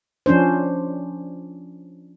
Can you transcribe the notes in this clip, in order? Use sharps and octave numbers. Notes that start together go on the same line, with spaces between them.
F3 C#4 D4 C5